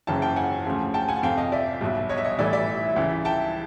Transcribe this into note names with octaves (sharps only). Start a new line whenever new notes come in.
F#1 F#2 C#3 E3 G5 A5
G5 A5
F#5 G#5
D2 C#3 F3
G5 A5
F#5 G#5
F2 C3 F3 F5 G5
D#5 F5
D5 E5
B1 B2 G3
C#5 D#5
E5
C#5 D#5
A1 A2 E3 G3 D5 E5
D5 E5
C#2 C#3 E3 G3
G5 A5